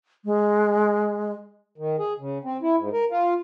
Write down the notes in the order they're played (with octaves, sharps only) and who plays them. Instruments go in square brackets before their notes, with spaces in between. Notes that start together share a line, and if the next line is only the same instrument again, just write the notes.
[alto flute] G#3
[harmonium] D#3
G#4
C#3
C4
E4
G#2
A#4
F4